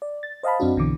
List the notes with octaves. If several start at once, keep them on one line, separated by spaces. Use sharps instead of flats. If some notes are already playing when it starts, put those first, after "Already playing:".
D5
A6
C5 D#5 F5 A5 B5
F#2 C4 D4 F#4
B1 B2 D3 E3 D6